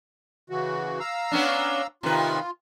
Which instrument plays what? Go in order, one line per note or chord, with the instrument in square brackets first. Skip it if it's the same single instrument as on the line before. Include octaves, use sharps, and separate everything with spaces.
[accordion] C#3 E3 F#4
F5 A#5 E6
[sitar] B3 C#4 D4
[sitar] C3 D#3 B4 [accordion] F4